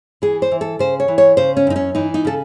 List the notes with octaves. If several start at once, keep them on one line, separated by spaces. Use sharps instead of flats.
E3 G#4
C5
E3
A4
C#3 C5
C#5
E3
C#5
C#3 C5
C#4
F#2 D#4
C#4
E3 D#4
D#4
C#3 A4